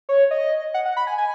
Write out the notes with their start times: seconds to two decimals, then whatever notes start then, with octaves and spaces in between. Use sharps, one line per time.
0.09 C#5
0.31 D#5
0.74 F#5
0.85 F#5
0.97 B5
1.07 G#5
1.18 G#5